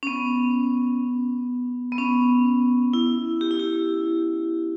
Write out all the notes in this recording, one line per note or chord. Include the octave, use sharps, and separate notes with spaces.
C#4
B3
B3
C#4
E4
G4
E4
G4